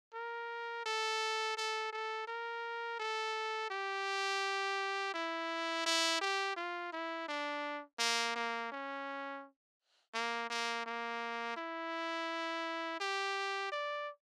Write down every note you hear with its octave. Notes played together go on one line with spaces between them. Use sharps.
A#4
A4
A4
A4
A#4
A4
G4
E4
E4
G4
F4
E4
D4
A#3
A#3
C#4
A#3
A#3
A#3
E4
G4
D5